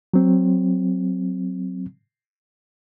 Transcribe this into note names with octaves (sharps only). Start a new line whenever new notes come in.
F#3 C4